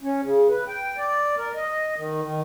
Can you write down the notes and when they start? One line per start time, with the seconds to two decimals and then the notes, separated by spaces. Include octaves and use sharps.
0.02 C#4
0.24 C#3
0.49 B4
0.68 G5
0.98 D5
1.38 A#4
1.55 D#5
1.96 D#3
2.22 D#3